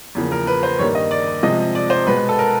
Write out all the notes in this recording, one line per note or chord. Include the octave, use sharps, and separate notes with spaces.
E2 C#3 F3 A#3
A#4
B4
C5
G2 D#3 G3 A#3 C#5
D#5
D5
C3 F3 G#3 C4 D#5
D5
C5
B2 G#3 B3 B4
A4
A#4